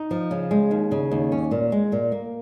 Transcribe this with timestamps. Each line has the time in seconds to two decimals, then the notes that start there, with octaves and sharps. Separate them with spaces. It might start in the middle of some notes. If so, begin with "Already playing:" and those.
Already playing: D#4
0.11 F3
0.31 C#3
0.51 G#3
0.71 D#2
0.92 C#3
1.11 D#2
1.32 C#4
1.51 A#2
1.72 G#3
1.92 A#2
2.12 A#3